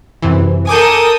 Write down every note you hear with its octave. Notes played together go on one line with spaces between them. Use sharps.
F#2 C3 E3
A4 A#4 G#5 D6 D#6 G6